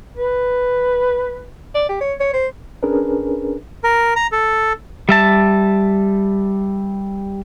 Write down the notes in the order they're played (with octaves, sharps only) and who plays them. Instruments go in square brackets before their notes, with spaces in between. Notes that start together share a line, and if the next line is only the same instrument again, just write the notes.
[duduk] B4
[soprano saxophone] D5
G4
C#5
C#5
C5
[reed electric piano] C#4 D4 G#4 A#4 B4
[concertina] A#4
A#5
A4
[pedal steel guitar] G3 E5 A5